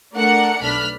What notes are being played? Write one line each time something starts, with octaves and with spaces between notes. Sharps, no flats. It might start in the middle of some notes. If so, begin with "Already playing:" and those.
A3 D4 A#4 F#5 C#7
B1 A3 D4 B5 F6 B6